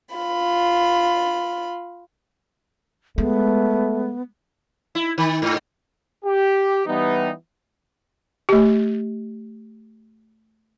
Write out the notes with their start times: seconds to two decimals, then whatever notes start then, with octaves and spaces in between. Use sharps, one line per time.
0.14 F4 B5
3.18 G#3 A3 B3
4.95 E4
5.18 D#3
5.42 G#2
6.25 G4
6.86 E3 G3 B3 D#4
8.49 A3 G4